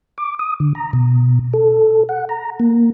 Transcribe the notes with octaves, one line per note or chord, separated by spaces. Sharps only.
D6
D#6
D3
A#5
B2
A4
F#5
A#5
A#3